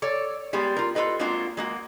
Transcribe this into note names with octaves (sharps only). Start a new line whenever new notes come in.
A4 C#5 D5
G3 G#3 B3 G4
F4 A#4
F4 F#4 A4 B4 D#5
G#3 A#3 C4 D4 F4 F#4
G#3 A#3 F#4